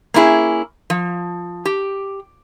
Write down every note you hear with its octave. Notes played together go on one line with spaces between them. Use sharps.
A#3 C#4 E4 G#4
F3
G4